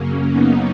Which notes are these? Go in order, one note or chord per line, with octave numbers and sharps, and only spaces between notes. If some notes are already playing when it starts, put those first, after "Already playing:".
Already playing: F#2 C#3 F#3 A#3 C#4
B3 D#4